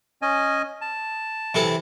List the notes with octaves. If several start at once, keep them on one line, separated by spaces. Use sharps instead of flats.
C#4 D#5 G#5
A5
C3 E3 A4